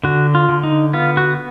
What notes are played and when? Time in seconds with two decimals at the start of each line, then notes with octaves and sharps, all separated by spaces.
0.04 D3 F#4
0.35 F4
0.49 D3
0.63 D#4
0.93 B3 F4
1.17 F#4